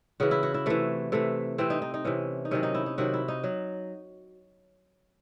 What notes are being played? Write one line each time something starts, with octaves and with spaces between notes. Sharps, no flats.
C#3 E3 F#4
E4
F#4
E4
C3 E3 A3
C3 E3 A3
C3 E3 C4
D#4
D#4
D#4
C3 E3 C#4
D#4
C3 D#3 F#3 C#4
D#4
E4
D#4
C3 D#3 F#3 F#4
E4
D#4
F#3